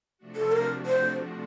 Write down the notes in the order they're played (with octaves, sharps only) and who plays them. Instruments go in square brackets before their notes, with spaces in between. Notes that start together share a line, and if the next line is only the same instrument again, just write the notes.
[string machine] C3 F3 A3 D4 F#4
[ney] A4
A#4
C5